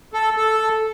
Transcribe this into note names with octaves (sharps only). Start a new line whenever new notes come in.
A4
A4